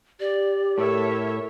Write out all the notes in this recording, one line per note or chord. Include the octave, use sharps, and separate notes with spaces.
G4 D5
A2 A4 A#4 C#5 E5